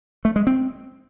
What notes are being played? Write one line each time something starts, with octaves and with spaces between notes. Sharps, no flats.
A3
G#3
C4